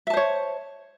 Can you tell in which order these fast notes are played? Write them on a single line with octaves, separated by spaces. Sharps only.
E5 A5 C5 C#5